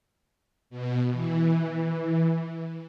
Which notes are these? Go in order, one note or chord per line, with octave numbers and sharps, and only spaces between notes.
B2
E3